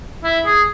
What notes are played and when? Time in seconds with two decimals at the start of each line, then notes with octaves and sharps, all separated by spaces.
0.24 E4
0.46 G#4